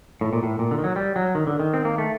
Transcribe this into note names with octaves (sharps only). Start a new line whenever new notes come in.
A2
A#2
A2
A#2
D3
D#3
F#3
G3
F#3
D#3
D3
D#3
C4
A#3
A3